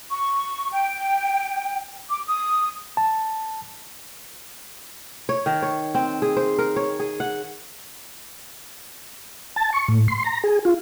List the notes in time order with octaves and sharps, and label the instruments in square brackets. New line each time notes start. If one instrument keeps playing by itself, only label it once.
[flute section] C#6
G5
D6
D#6
[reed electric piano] A5
[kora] C#5
D#3
C#5
C4
G#4
C5
A#4
C#5
G#4
F#5
[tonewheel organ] A5
C#6
A2
C6
A#5
G#4
F4